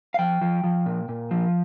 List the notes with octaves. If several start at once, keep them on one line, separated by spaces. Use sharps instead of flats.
F5
F3 G5
F3
F3
A#2
A#2
F3